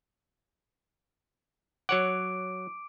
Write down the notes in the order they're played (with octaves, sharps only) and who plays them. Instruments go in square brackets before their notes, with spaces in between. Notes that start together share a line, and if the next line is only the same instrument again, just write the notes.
[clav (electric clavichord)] F#3 C#5 F#5 [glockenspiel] D6 D7